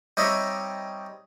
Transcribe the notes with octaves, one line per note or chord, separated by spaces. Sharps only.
G3 C4 D#4 C#5 D#5 E5